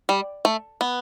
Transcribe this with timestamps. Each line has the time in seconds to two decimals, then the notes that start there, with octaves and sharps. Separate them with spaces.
0.09 G3
0.45 A3
0.81 B3